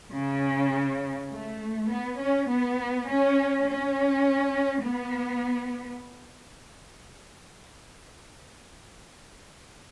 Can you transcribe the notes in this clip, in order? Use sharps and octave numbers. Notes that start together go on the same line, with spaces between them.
C#3
A3
B3
C#4
B3
C#4
C#4
B3